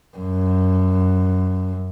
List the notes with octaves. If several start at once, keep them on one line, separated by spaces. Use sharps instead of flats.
F#2